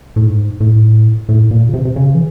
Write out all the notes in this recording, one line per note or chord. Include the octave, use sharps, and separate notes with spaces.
A2
G#2
A2
A2
A#2
C#3
C3
C3
C#3
E3